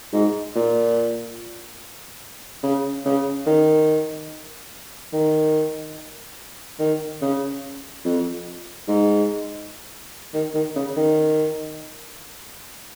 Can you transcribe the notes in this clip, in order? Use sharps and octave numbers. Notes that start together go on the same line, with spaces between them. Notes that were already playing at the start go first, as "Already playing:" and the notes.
G#2
A#2
C#3
C#3
D#3
D#3
D#3
C#3
F2
G#2
D#3
D#3
C#3
D#3